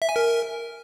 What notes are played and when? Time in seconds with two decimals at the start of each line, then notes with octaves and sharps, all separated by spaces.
0.02 E5
0.09 G#5
0.16 A#4